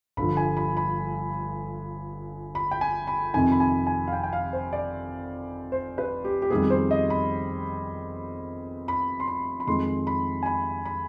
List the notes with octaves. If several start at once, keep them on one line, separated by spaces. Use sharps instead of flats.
G1 G2 D3 F3 B5
G#5
B5
B5
B5
G5
G#5
B5
F2 C3 D#3 G#5
B5
G#5
G#5
F5
G5
G5
F5
C5
D5
C5
B4
G4
G4
F2 D#3 G3 B3 G#4
C5
D#5
B5
B5
C6
B5
B5
F2 D#3 G#3 C6
B5
G#5
B5
B5